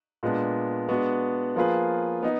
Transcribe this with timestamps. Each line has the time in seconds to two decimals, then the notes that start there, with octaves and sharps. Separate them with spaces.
0.23 A#2 G#3 B3 D4
0.89 G#3 B3 D4 F#4
1.56 F3 A#3 F4 G#4 B4
2.23 B3 D#4